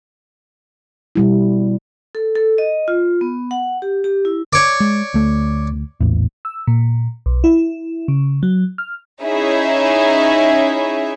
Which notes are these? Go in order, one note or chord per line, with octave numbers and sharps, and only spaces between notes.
B2 G3 E4
A4
A4
D#5
F4
B3
F#5
G4
G4
E4
C#5 D5
G#3
D2 A3
A#1 E2 A2
E6
A#2
B1
E4
C#3
F#3
F6
C#4 D#4 E4 G#4 E5